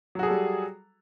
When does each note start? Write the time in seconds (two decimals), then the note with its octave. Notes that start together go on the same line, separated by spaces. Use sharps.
0.15 F#3
0.19 F#4
0.23 G#4
0.27 A4
0.31 G3